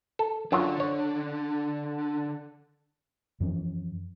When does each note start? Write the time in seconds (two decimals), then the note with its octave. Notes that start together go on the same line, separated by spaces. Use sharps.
0.19 A4
0.52 F#2 D3 F#3 D4 F4
0.80 C#5
3.40 F#2 E3 F3 C#4